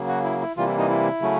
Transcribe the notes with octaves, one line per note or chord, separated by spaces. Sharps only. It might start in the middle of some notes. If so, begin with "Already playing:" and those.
Already playing: C#3 F#3 A#3
F#4
E4
E4
C3 E3 G3 A#3 F4
E4
D#4
E4
C#3 F#3 A3 C#4